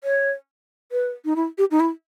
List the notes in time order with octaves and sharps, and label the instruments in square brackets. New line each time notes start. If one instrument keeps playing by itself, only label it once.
[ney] C#5
B4
D#4
E4
G4
D#4
E4